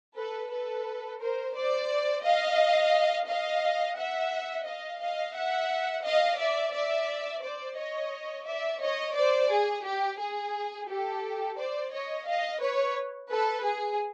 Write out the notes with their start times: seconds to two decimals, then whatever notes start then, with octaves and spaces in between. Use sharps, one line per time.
0.17 A4 B4
0.51 A4 B4
1.21 A#4 C5
1.55 C5 D5
2.24 D#5 F5
3.28 D#5 F5
3.97 E5 F#5
4.66 D#5 F5
5.01 D#5 F5
5.35 E5 F#5
6.05 D#5 F5
6.39 D5 E5
6.73 D5 E5
7.42 C5 D5
7.77 C#5 D#5
8.46 D5 E5
8.81 C#5 D#5
9.15 C5 D5
9.50 G#4
9.85 G4
10.19 G#4
10.89 G4 A4
11.58 C5 D5
11.92 C#5 D#5
12.26 D#5 F5
12.61 B4 C#5
13.30 A4 B4
13.64 G#4